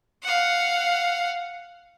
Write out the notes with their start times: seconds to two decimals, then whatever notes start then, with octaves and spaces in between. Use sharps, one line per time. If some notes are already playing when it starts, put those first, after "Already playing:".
0.23 F5 F#5